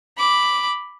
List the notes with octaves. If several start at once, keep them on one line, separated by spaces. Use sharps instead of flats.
B5 D6